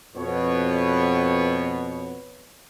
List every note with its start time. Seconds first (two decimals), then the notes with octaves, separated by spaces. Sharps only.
0.15 F2 B2 B3 C#5